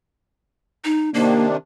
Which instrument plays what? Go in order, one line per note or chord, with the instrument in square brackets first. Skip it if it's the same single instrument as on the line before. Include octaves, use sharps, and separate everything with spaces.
[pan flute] D#4
[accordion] C3 D#3 D4 [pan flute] A#3